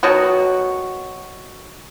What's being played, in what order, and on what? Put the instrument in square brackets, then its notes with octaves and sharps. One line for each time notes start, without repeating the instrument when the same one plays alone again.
[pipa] B2 D#3 F#3 F#4